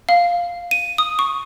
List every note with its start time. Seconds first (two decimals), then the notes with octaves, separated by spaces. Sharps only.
0.09 F5
0.71 D#7
0.98 D#6
1.19 C#6